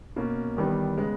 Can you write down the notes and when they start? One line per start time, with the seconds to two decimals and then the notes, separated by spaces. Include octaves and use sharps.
0.16 B2 A#3 C#4
0.57 E2 D#3 G3 B3
0.97 C#3 G#3 B3